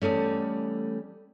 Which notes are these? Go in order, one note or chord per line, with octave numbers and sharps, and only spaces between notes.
E2 F3 G3 A3 C#4